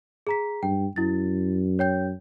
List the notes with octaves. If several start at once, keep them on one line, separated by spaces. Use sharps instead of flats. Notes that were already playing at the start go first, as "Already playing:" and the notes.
G#4 A#5 B6
G2 G5
F#2 E4 A6
C#5 G5 G6